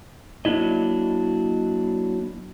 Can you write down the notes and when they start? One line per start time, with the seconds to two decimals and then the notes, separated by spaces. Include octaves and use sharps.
0.45 F#3 A#3 D4 E4 D#5